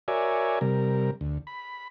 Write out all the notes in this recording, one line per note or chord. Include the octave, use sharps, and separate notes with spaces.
F#4 A#4 C#5 D5 E5 G#5
C3 G3 A#4
D2
B5